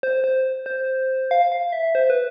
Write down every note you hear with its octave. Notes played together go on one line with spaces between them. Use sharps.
C5
C5
C5
F5
F5
E5
C5
B4